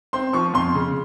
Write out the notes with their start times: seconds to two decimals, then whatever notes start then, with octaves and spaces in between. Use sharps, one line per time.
0.13 C4 C6
0.33 F3 C#6
0.54 F2 C6
0.74 C#3